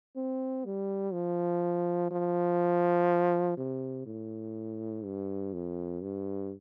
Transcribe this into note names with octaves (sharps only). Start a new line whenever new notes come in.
C4
G3
F3
F3
C3
A2
G2
F2
G2